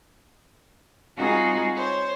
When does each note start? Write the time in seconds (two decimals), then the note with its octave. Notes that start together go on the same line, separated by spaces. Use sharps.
1.17 G3 C4 D#4 F4 F#4 G#4
1.76 C5 C#5